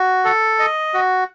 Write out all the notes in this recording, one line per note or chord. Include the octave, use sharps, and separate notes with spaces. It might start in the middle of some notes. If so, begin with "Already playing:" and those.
Already playing: F#4
A4
D#5
F#4